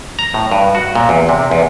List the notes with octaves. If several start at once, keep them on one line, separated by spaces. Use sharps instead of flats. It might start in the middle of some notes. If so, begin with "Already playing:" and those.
A#5
A2
G2
F#4
A#2
E2
C3
E2